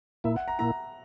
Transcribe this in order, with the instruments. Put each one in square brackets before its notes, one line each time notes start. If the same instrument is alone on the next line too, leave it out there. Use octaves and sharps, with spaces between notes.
[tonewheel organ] A#2 A#3 E4 [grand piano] E5
[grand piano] F#5
A#5
[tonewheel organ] A#2 A#3 E4 [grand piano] A#5